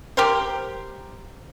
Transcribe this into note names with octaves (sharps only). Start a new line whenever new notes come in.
G4 A#4 C5